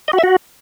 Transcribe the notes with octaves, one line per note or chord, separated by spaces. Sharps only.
D#5
F#4
E5
F#4